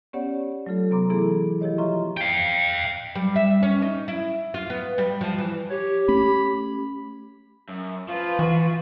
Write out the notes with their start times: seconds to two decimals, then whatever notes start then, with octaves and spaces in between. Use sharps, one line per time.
0.13 B3 C#4 G4 C#5 D5 F#5
0.66 F#3 A3 F4 A4
0.91 C3 F#3 B3 A#5 C6 D6
1.10 E3 A3 B3 E4 G#4 A4
1.61 F3 E4 G4 C#5 D#5
1.78 F4 D#5 E5 A#5 C6 C#6
2.17 F5 G5
3.15 G3
3.36 E5
3.63 C#4
3.82 D#4
4.08 E4
4.54 F4
4.70 B3
4.98 G3
5.21 F3
5.38 E3
5.70 G4 C#5
6.08 A3 C#4 B5
7.69 F#2
8.09 F3 F4 B4
8.39 E3 F#4